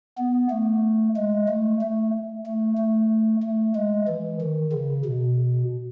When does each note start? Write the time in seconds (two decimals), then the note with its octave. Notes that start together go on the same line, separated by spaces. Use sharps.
0.18 B3
0.50 A3
1.16 G#3
1.49 A3
1.81 A3
2.46 A3
2.78 A3
3.43 A3
3.75 G#3
4.08 E3
4.41 D#3
4.73 C#3
5.05 B2